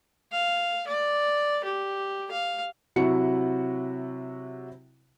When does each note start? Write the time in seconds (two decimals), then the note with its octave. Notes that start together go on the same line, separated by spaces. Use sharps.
0.32 F5
0.87 D5
1.64 G4
2.31 F5
2.96 C3 F#3 E4 F#4 F#5 C#7